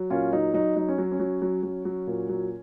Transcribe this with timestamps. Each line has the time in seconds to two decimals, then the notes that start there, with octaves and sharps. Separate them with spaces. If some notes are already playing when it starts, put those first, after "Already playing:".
Already playing: F#3
0.10 A#2 C#4 F4
0.33 F#3 D#4
0.54 F#3 D#4
0.76 F#3 D#4
0.88 C#4
0.98 F#3
1.12 C#4
1.20 F#3
1.42 F#3
1.63 F#3
1.85 F#3
2.07 A#2
2.29 F#3